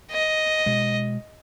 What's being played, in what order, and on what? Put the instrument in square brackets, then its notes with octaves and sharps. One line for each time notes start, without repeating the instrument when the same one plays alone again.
[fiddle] D#5
[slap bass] B2 G#3